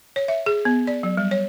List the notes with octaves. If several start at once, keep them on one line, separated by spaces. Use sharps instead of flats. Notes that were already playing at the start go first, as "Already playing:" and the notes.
C#5
E5
G#4
B3
D5
F#3
G3
C#5